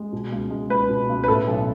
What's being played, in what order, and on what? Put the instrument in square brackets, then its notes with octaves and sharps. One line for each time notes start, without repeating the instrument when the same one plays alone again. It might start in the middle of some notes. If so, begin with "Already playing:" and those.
Already playing: [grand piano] G#3
B2
C#2
G#3
C#2 B4
B2
C#2
B4
A2 A4
B1